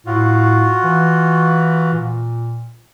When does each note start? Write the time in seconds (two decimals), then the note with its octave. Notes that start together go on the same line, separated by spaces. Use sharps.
0.07 A2 F4 F#4
0.84 E3
1.93 A#2